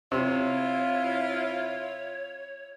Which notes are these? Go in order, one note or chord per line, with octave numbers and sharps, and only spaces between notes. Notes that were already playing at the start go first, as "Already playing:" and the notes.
C3 E4 F4 C#5